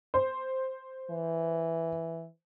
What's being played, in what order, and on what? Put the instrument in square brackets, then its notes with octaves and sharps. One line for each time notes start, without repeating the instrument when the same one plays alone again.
[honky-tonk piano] C5
[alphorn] E3